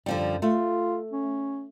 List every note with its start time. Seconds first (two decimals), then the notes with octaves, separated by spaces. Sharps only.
0.06 F#2 D3 F3 G3
0.42 A3 F4
1.12 C#4